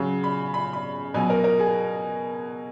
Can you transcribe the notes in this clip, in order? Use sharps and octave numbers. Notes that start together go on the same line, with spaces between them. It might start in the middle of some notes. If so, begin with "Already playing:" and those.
Already playing: C#3 F#3
B5
B5
B5
B2 F#3 G#5
A#4
A#4
G#4